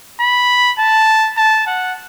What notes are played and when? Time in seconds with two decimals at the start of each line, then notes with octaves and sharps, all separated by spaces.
0.20 B5
0.79 A5
1.37 A5
1.67 F#5